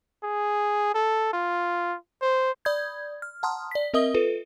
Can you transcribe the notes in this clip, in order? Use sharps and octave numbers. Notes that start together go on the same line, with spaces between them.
G#4
A4
F4
C5
D5 B5 D#6 G6 G#6
F6
F#5 A5 A#5 C6 D#6 F6
D5 B6
C4 A#4 D#5 E5 D#6 G7
F4 A4 B4